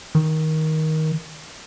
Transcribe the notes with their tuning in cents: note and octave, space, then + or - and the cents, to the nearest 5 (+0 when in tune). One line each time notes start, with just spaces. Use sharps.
D#3 +15